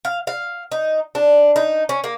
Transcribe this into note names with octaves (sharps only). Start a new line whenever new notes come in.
F5
F5
D#4
D4
D#4
C#4
A#3